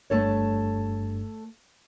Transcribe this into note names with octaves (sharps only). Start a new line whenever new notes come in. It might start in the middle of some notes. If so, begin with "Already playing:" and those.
G1 G2 A3 A4 C#5